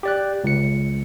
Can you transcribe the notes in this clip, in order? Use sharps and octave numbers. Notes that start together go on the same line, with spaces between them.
G4 D5 F#6
C#2 C#7